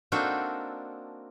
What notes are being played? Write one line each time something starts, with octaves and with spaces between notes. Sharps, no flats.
A#3 C4 D4 D#4 F#4 A4